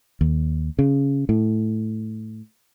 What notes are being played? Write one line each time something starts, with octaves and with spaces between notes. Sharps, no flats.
D#2
C#3
A2